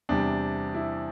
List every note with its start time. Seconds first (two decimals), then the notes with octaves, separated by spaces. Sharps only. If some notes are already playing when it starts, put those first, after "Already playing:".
0.09 E2 C3 G3 D4
0.75 E4